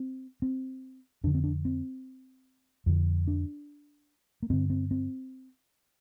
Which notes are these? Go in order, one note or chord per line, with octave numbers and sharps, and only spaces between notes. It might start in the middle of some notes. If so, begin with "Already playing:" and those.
Already playing: C4
C4
F2 D3 D4
C4
D4
C4
F2 D3
D4
A#3
G2 D3 C4
C4
C4